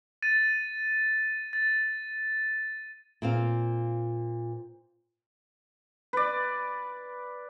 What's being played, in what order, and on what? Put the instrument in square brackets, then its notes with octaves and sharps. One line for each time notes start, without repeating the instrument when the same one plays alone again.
[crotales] A6 D#7
A6
[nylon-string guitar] A#2 C4 F5
[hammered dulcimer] B4 D5